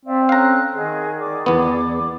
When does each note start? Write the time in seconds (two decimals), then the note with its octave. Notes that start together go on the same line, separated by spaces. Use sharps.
0.05 C4 D5 E5 F5
0.29 C#4 A4 F5 A#5 F#6
0.74 D#3 G#4 D#5 F#5
1.18 G#4 D5 D6
1.46 E2 B3